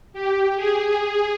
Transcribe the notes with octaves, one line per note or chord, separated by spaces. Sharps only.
G4
G#4